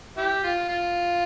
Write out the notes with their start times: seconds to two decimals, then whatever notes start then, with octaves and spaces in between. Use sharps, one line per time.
0.17 E4 G4
0.43 F4
0.69 F4